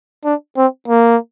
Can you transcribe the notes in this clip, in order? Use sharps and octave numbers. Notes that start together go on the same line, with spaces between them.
D4
C4
A#3